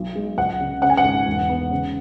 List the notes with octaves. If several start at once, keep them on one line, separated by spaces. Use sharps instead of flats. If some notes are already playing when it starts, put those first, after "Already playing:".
Already playing: B1
G#3
C#2 F#5
C#3
C#3 F#5
G#5
F#5
G#1
E1
B3
C#3